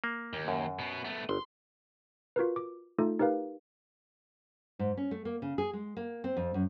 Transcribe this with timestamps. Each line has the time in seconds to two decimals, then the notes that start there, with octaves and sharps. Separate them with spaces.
0.04 A#3
0.33 D#2
0.48 F#2
0.79 B2 B3
1.05 A3 B3
1.29 G1 C6
2.36 F4 F#4 A#4 B4
2.56 D6
2.98 A3 D#4 F4 A4
3.19 D#4 G4 A#4 B4 F5
4.79 G#2
4.97 C#4
5.11 A3
5.25 A#3
5.42 C#3
5.58 G#4
5.73 G#3
5.97 A#3
6.24 C4
6.37 F2
6.54 F#2